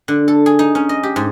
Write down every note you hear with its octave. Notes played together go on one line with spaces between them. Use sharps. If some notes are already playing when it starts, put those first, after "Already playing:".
D3
A4
G#4
D#4
C#4
D#5
G4
G#2